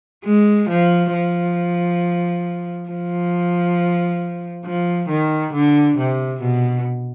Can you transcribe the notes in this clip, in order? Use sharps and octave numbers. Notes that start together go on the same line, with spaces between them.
G#3
F3
F3
F3
F3
D#3
D3
C3
B2